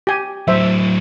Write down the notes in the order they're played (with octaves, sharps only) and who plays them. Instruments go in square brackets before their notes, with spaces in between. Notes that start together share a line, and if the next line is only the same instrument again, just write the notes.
[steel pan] G4 G#5
[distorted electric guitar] A2 F#3 [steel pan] C5 E5